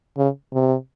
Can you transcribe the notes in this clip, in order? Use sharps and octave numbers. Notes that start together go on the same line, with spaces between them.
C#3
C3